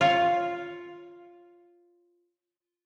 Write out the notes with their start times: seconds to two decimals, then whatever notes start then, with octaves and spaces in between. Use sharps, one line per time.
0.01 F4 C#5